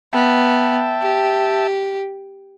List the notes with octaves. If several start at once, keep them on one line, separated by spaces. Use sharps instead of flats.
B3 E5 G5 A5
G4